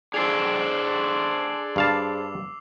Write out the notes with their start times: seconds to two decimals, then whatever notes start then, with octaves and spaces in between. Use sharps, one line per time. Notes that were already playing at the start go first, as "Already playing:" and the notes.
0.14 D4 G#4 A4 C5 E6 C7 F7
1.76 G2 F5 A5 D6 F7